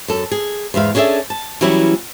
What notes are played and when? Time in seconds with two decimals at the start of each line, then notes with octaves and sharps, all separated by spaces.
0.08 F#2 A4
0.32 G#4
0.74 E2 G#2 E5 F5
0.95 C#4 D4 G#4 A4 E5
1.30 A5
1.61 E3 F#3 G3 B3 C#4 E4